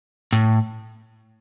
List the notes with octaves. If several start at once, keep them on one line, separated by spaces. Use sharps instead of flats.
A2